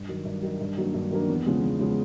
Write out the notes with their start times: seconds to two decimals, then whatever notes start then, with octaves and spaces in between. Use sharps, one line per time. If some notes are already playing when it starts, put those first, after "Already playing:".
Already playing: G2
0.09 D#3 F#3
0.25 G2
0.42 D#3 F#3
0.60 G2
0.77 D#3 F#3 A#3 D4
0.94 G2
1.11 D#3 F#3 A#3 D4
1.29 E2
1.46 C#3 F3 G#3 B3
1.63 E2
1.79 C#3 F3 G#3 B3